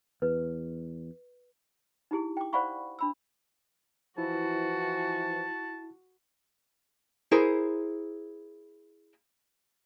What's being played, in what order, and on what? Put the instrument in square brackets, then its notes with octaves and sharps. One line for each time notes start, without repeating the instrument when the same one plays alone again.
[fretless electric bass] E2 [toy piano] B4
[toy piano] D#4 E4 G4 G#4
G5 D6
C5 D5 F5 F#5 B5 C#6
D4 B5 E6
[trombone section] E3 F3 [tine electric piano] E4 [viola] F#4 [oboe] A5
[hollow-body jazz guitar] E4 G#4 A#4 C5